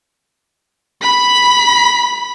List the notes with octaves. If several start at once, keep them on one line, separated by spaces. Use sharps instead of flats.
B5 B6